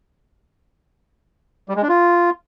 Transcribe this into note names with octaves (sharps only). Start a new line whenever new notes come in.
G3
G#3
D4
F4